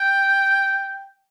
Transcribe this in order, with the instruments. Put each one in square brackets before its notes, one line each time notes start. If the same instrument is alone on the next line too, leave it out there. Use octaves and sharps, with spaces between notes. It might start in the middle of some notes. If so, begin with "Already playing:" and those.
Already playing: [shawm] G5